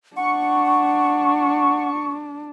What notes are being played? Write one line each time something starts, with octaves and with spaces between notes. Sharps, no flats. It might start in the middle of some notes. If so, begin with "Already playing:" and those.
D4 F#5 C#6